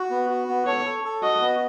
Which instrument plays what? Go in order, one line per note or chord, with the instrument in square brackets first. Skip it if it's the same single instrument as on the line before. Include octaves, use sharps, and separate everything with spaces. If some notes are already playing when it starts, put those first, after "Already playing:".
Already playing: [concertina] F#4
B3
F#4
B3
[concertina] A4 [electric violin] C#5
[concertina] A4
A4
[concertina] F#4 [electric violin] D#5
[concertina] B3